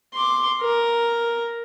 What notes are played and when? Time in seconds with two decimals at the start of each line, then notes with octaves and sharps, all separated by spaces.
0.13 C6 D6
0.61 A#4